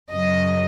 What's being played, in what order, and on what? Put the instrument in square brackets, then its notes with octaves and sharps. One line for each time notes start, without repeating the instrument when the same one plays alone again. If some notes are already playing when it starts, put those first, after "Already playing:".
[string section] F#2 C#3 F#3 D#5